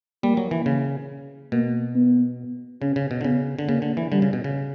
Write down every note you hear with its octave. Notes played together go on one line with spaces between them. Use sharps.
G3 A#3
F#3
E3
C#3
B2 A#3
B3
C#3 C#4
C#3
B2
D3
C#3 B3
D3
C#3 A#3
D3
E3
D3 G3
C#3
B2
C#3